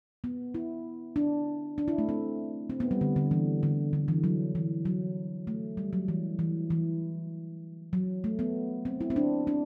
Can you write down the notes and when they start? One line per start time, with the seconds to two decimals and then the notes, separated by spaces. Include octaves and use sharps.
0.24 B3
0.55 E4
1.16 D4
1.78 D4
1.88 E4
1.98 A3
2.09 C4
2.70 C4
2.80 B3
2.91 G3
3.01 D3
3.16 D3
3.31 E3
3.63 D3
3.93 D3
4.08 E3
4.24 F#3
4.55 E3
4.85 F#3
5.47 A3
5.77 G3
5.93 F#3
6.08 E3
6.39 E3
6.70 E3
7.93 F#3
8.24 A3
8.39 B3
8.85 C4
9.01 E4
9.10 C4
9.16 D4
9.47 D4